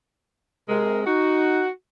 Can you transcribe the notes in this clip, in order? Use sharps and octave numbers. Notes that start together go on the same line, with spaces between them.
C3 G#3 A#4
D#4 F#4